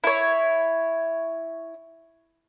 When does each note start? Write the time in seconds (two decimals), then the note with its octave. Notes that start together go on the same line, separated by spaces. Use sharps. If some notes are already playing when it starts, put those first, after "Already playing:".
0.04 E4 C#5